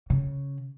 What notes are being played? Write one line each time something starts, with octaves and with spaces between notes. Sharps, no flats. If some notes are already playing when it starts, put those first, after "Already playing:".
C#3